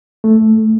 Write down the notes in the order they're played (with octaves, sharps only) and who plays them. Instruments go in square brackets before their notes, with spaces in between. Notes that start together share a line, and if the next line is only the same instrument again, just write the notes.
[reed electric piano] A3